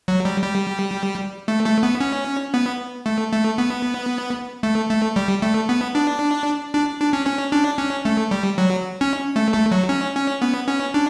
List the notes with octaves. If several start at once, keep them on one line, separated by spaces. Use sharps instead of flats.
F#3
G3
G3
A3
A3
B3
C#4
B3
A3
A3
B3
A3
A3
G3
A3
B3
D4
D4
D4
C#4
C#4
D4
C#4
A3
G3
F#3
C#4
A3
A3
F#3
C#4
C#4
B3
C#4
D4